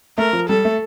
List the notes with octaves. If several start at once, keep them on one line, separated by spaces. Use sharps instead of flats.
A3 A#4
F3
G3 A4
A3